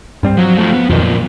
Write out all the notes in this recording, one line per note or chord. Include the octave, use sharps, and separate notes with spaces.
G2 G3 C4
F3 F#3
A3 F4
B3
F2 B2 D#3 F3 B3
A#2